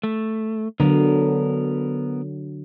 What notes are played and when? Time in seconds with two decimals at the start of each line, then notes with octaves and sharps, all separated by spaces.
0.03 A3
0.80 D3 F#3 B3 A#4